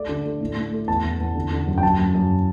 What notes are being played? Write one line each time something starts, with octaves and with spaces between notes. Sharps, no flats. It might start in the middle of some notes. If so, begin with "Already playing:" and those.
Already playing: A3 D5
D3
A3
A2
A2
A3
E2 A5
E2
E2
D3
D3
F#2
G5
F#2 A5
F#2
F#2